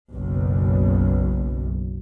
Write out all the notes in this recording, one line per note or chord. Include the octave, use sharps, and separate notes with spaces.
F#1 B1